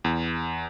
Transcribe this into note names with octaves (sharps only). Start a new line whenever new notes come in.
E2